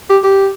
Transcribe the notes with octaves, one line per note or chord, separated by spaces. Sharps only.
G4
G4